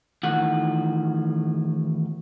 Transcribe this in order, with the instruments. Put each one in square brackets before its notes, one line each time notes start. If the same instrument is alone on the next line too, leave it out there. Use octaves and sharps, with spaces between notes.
[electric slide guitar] E2 A2 D#3 F4 F#5